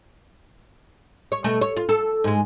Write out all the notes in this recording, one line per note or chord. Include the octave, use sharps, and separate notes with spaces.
C#5
B2 A3
C#5
F4
A4
G#2 G#3